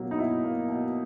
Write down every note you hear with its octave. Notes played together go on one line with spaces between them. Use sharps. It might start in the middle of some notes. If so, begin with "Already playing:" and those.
Already playing: B2 F#3 A#3
D#4
B2 E4
A#3
B2